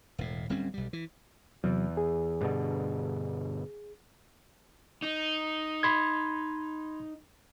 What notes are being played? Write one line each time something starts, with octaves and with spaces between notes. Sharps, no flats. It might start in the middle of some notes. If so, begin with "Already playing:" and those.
E1 A2
D1 G3 C4 C#4
B1 G3
E3
E2 C3 F#3
G#4
G2 B2 D3
D#4
B5 C6 G#6